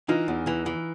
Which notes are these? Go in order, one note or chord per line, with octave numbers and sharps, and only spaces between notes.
E3 D#4 F4
E2
E3
E3